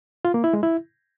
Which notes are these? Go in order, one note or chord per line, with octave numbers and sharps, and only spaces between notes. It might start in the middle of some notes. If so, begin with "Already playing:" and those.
F4
A#3
E4
G#3
E4